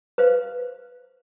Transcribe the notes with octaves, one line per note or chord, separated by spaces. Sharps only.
B4 C5 F5